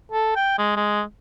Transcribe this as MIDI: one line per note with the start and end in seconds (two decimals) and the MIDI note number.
0.12 0.35 69
0.36 0.56 79
0.58 0.76 56
0.76 1.03 56